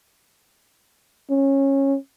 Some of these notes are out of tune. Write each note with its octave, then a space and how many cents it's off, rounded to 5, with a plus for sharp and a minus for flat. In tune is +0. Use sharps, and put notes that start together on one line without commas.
C#4 -15